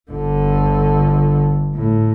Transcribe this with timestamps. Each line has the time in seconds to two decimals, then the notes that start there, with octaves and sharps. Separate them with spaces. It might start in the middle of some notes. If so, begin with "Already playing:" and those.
0.11 G1 D3
1.75 A2